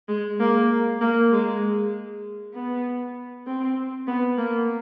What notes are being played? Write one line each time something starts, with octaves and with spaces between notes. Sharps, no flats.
G#3
A#3
A#3
G#3
B3
C4
B3
A#3